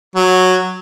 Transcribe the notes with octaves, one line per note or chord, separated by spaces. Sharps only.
F#3